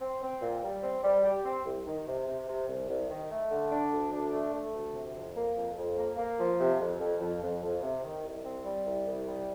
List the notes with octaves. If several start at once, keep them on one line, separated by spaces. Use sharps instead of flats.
C4
C4
A#2
G3
C4
G3
G4
C4
C2
D#3
C3
C3
C3
C2
C2
D#3
A3
D3
D4
D2
D4
A3
A3
D2
C3
F2
A#3
F2
F2
A#3
A#3
F3
C3
F2
F2
F2
F2
F2
C3
D#3
C2
C4
G3
C2
C2
G3